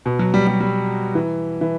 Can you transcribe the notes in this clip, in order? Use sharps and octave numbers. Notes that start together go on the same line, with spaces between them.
B2
F#3
G3
G3
G3
E3
E3